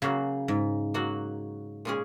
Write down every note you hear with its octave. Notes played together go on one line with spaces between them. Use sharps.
C#3 F#3 A#3 F#4
G#2
F#3 A#3 F#4
A#2 G#3 C#4 G#4